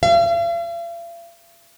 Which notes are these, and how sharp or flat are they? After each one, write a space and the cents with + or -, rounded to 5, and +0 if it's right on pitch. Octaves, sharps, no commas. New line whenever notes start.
F5 -45